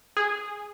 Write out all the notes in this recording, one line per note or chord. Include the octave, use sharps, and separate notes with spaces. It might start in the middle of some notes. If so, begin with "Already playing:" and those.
G#4